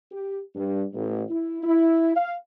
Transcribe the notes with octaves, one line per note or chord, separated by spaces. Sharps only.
G4
G2
A1
E4
E4
F5